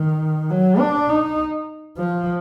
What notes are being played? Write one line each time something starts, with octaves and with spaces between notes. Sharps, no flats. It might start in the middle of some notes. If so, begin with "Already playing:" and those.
Already playing: D#3
F#3
D4
D#4
F3